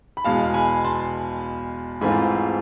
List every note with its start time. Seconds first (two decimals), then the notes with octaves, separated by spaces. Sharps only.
0.17 B5
0.24 E2 B2 G#3 F5 A5
0.54 G#5 B5
0.84 A5 C6
2.01 G#2 E3 A3 C4 F4 G#5 B5